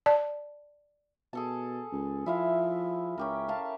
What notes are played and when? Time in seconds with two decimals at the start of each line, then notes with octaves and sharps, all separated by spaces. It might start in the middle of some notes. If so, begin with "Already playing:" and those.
0.06 D5 A5
1.33 B2 G#4 A4 A5
1.92 C#2
2.26 F3 E4 E5 F5
3.18 C#2 C#4 G4 A#4
3.48 E5 F5 A5